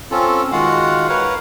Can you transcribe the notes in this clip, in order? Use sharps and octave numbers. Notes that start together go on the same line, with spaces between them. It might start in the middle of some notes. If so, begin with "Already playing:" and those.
C4 C#4 F4 A4
D#3 G#3 F4 F#4 F5 F#5
A#4 B4 C#5 F5 F#5